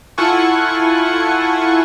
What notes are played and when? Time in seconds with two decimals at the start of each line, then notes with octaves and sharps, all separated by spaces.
0.18 E4 F4 A4 F#5 G#5 C#6